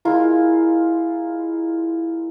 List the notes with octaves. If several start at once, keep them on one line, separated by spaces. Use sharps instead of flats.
G#3 E4 F4 A#4